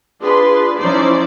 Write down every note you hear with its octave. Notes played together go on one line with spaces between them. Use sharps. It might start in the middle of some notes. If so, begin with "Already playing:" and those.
D4 F4 G#4 B4 C6
F3 C#4 D#4 E4 C5 D5